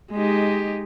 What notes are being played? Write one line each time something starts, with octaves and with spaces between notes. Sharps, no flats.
G#3 D#4 G4